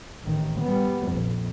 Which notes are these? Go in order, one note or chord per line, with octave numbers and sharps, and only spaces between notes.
A1 D#3
G3 B3
A#1 F2